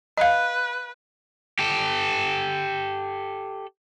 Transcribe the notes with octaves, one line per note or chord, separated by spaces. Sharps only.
B4 D#5 F5
G4 A4